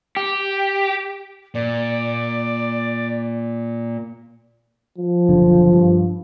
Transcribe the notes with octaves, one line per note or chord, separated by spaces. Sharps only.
G4
A#2 D5
F3
F#1 B1 D3
G2